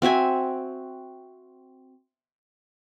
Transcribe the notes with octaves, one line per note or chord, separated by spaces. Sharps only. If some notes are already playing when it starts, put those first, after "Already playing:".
C4 F#4 E5 G#5